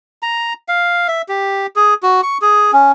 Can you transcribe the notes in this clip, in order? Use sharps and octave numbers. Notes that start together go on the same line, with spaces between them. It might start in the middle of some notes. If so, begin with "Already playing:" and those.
A#5
F5
E5
G4
G#4
F#4
C#6
G#4
C#4